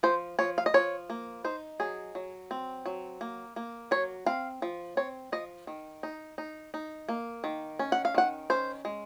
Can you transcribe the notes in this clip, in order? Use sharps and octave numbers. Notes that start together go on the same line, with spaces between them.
F3 C5
F3 C#5
F5
D#5
F3 C#5
A#3
D#4 C5
F#3 G#4
F#3
C4
F#3
A#3
A#3
F#3 C#5
C4 F5
F3
C4 C#5
F3 D#5
D#3
D#4
D#4
D#4
A#3
D#3
C#4
F#5
F5
D#3 F#5
C#4 C5
G#3